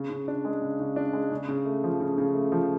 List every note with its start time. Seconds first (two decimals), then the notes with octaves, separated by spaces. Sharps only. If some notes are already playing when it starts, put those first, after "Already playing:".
Already playing: C#3
0.10 C#3
0.28 D4
0.45 G#3
0.62 C#3
0.80 C#3
0.96 D4
1.13 G#3
1.31 C#3
1.49 C#3
1.65 A3
1.84 F3
2.00 C#3
2.18 C#3
2.35 A3
2.52 F3